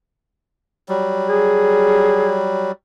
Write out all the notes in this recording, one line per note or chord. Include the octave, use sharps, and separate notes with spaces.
F#3 G3
G#4